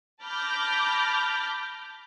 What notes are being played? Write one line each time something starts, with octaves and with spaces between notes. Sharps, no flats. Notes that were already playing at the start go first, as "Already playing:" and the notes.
A5 B5 D6 F6 G6 A#6